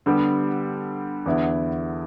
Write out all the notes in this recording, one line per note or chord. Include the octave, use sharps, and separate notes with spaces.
D3 G3 B3 G4
E2 D3 B3 E4